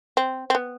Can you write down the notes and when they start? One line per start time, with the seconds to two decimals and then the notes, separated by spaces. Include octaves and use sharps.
0.17 C4
0.50 C4
0.55 B3